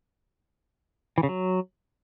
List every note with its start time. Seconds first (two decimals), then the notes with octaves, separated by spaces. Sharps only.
1.18 E3
1.23 C#3
1.29 F#3